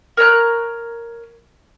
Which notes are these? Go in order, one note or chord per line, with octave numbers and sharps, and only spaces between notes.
A#4 C#5 A#5 F#6